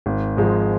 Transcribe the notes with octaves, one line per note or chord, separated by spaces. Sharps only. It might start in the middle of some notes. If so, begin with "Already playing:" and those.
G#1
G#2 F3 G#3